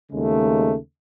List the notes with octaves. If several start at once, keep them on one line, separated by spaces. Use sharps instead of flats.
D#2 C#3 G#3 A3